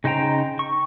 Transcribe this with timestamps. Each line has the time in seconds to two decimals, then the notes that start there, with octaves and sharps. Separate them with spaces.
0.04 C#3 D#4 C5 G5 A#5
0.59 C#6